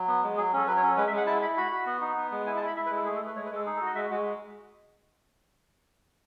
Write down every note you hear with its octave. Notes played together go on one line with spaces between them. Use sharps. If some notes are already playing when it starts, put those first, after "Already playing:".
Already playing: F#3
B3
G#3
F#3 G#4
C#4 A4
F#3 B4
C#5
C#4 A4
G#3 B4
E5
G#3
F#5
E4 A5
E4 B5
F#4 B5
F#4
B3
D#4
B3
G#3
E4 G#5
A5
E4 B5
E4 E5
B4
G#3
A4
A3 G#4
A4
A3 B4
G#3 C#5
B4
G#3 A4
D#4 G#4
A4
F#4
D#5
G#3 E5
G#3 F#4